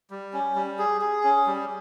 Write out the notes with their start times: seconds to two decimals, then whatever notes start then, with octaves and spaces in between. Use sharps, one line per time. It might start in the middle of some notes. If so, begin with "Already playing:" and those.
0.10 G3
0.33 C#4
0.56 G3
0.79 G#4
1.01 G#4
1.24 C#4
1.46 G3